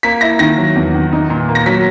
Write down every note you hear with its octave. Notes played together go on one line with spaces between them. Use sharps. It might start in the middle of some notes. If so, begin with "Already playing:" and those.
A#3 B6
E4 A#6
D#3 A#6
F#3
E2
D#3
D#4
A#2
A#3
A#6
F#3 B6